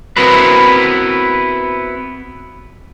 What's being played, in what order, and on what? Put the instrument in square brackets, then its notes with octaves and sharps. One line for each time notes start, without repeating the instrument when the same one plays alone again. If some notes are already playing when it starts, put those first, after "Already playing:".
[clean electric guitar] B3 C4 E4 F#4 A#4 B4